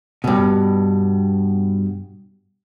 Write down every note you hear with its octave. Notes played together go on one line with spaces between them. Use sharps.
G2 B2